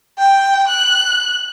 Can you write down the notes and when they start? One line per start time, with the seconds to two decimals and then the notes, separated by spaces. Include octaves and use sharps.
0.18 G5
0.68 F#6